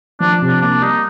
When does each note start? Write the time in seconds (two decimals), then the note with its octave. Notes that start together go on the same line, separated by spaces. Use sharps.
0.20 F3 D4
0.42 C3
0.47 D4
0.61 A#3 D4
0.82 G3 D#4